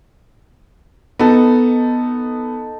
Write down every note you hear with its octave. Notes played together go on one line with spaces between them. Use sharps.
B3 D#4 A4